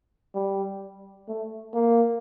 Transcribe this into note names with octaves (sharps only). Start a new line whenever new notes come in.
G3
A3
A#3